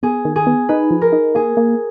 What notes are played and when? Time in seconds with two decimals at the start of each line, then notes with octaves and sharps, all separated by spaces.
0.03 B3 G#4
0.25 D#3
0.36 G#4
0.47 B3
0.69 D#4 B4
0.91 F3
1.01 A#4
1.13 D#4
1.35 A#3 G#4
1.57 A#3